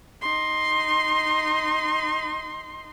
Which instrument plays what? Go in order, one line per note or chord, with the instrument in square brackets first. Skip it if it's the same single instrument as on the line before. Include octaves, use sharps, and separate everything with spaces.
[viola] D#4 C6